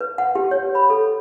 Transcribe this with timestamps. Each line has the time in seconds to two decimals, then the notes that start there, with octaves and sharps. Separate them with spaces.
0.01 B4
0.18 F#5
0.35 G4
0.51 C#5
0.75 B5
0.90 A4